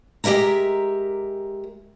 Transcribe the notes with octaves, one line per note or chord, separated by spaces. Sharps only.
G#3 G4 A#4 E5 A#5